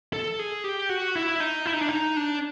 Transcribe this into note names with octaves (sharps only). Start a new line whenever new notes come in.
A4
G#4
G4
F#4
E4
D#4
E4
D#4
D4
D#4
D4